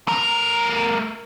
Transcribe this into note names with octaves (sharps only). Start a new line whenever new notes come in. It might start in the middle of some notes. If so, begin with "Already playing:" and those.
A3 A#4